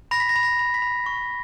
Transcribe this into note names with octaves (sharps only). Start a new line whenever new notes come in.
B5 A#6
B6
A#6
B5
A#6
B5
B6
B5
C#6